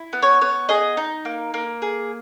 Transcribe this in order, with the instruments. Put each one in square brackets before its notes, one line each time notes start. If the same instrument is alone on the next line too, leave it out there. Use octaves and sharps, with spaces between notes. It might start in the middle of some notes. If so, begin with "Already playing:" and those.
Already playing: [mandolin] E4
B3
C#5
B3 C#5
G#4 D#5
D#4
A#3
A#3
G#4